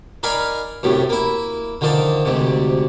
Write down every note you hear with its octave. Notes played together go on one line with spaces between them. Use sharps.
D#4 A#4 D5 F5 G#5 B5
F#2 A2 C3
A#3 E4
D3 D#3 F3 D#4 D5
D2 G#2 C3